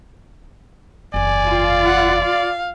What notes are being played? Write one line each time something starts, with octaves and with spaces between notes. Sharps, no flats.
F#1 E2 D5 G#5
F4
F#5
F5